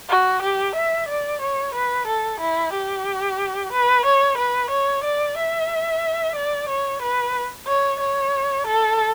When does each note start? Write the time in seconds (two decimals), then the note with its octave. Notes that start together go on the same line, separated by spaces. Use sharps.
0.09 F#4
0.42 G4
0.75 E5
1.09 D5
1.42 C#5
1.75 B4
2.07 A4
2.40 E4
2.73 G4
3.72 B4
4.06 C#5
4.38 B4
4.70 C#5
5.04 D5
5.37 E5
6.35 D5
6.69 C#5
7.02 B4
7.67 C#5
8.00 C#5
8.67 A4